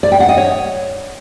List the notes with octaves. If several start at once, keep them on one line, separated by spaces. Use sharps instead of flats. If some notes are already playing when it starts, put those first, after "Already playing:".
D5
G5
F#5
D#5
C#5